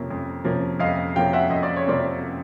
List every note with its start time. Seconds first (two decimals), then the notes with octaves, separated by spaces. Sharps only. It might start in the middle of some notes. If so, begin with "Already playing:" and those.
Already playing: F2 C3 F3 A#3 C#4
0.11 F2
0.44 C3 F3 A#3 C#4
0.80 F2 D#5 F5
1.16 C3 F3 A#3 C#4 F5 G5
1.33 E5 F#5
1.50 F2 D#5
1.63 D5
1.76 C#5
1.85 C3 F3 A#3 C#4 C5 D5